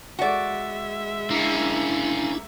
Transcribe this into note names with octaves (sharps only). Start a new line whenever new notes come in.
G#3 F#4 D5 E5
A#3 C#4 D4 E4